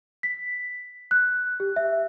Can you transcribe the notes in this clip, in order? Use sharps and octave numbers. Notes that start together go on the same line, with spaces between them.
B6
F#6
G4
E5